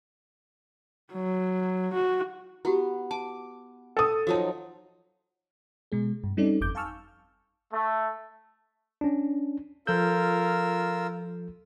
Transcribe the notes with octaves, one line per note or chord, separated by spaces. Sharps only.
F#3
F#4
B3 E4 F#4 G4
A5 D6
A4 D#6
F3 F#3 D#4 F#4 A5
B2 G#3 G#4
G2
G3 C4 C#4 D#4 A4 D5
G1 F2 D6 G6
F5 G#5 A5 C#6 E6 F6
A3
C#4 D4
F3 F4 A4 A#4 E6 G6